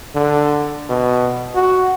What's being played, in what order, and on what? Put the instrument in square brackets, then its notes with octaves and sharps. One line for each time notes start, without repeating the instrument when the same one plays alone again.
[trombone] D3
B2
F#4